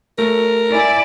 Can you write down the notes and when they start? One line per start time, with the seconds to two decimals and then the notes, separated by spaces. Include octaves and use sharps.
0.18 A3 A#4
0.73 E4 D5 G#5